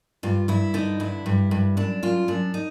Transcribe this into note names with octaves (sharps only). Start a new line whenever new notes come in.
G2 F4
G2 E4
D3 D#4
G2 E4
G2
G2
F#2 D4
F#2 F4
F#2 D4
D#4